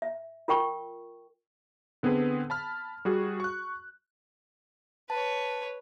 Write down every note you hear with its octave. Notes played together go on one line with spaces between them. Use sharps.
E5
F4 A#4 G5 C#6
D3 B3 C4 G#4 B4
A5 B5 F6
G3 F#4 G#4
C#6 F#6
B4 C#5 A5